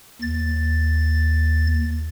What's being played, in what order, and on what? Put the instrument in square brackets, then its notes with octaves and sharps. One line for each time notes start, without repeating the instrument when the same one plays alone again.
[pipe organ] D#2 A6